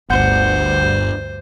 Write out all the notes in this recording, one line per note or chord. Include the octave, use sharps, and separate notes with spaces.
G1 D2 G2 C5 F#5 G6